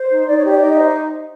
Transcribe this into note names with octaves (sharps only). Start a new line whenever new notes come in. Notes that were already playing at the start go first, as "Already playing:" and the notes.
Already playing: C5
D#4
D#4 D5
C#5
G4
D5
D#4 D#5
E5
C5